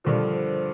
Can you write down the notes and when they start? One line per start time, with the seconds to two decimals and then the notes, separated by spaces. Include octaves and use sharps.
0.04 G2 D3 F3 A#4
0.33 C5